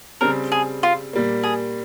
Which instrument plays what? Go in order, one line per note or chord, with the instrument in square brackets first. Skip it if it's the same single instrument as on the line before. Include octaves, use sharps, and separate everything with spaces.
[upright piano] C#3 G3 C4 [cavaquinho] A#4
[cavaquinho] G#4
F4
[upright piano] A#2 G3 A#3
[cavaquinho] G#4